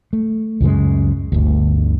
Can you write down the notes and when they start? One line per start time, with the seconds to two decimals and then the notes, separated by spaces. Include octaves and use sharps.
0.13 A3
0.61 C#2 F#2 C#3 G#3
1.32 G1 D2